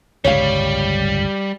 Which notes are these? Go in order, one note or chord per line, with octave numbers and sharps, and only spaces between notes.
G1 C#2 A2 G3 C#5 F5